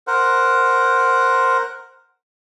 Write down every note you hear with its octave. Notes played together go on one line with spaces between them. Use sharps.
A#4 C5 F#5